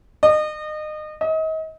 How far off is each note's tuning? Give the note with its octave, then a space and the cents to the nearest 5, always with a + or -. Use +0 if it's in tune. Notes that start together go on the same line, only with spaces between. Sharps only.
D#5 -30
D#5 +35